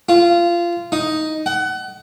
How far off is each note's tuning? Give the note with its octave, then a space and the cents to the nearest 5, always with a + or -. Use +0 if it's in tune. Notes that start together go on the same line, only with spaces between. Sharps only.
F4 -20
D#4 +5
F#5 +25